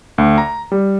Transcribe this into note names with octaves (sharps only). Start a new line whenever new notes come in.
D2
A#5
G3